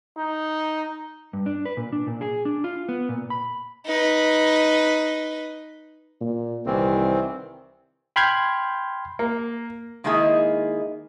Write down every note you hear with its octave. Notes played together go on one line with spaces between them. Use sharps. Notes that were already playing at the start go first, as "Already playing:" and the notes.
D#4
G2
D4
B4
A#2
D4
A#2
G#4
D4
F4
B3
A#2
B5
D#4 B4
A#2
C2 D#3 E3 C4
G5 B5 C6 F6 G6 G#6
A#3
D#3 G#3 A#3 D#4 E4 G#4